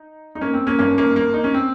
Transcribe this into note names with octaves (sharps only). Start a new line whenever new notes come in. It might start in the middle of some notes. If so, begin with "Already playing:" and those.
Already playing: D#4
D#4
A#3 C#4
C4
A#3 C#4
G#1 G2 D#3 A#3 C#4
A#3 C#4
A#3
D#4
C#4
C4